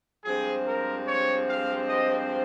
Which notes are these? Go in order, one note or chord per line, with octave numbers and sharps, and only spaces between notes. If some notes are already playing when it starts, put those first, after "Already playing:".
G2 F3 G#3 C4 G#4
A#4
C#5
F5
D#5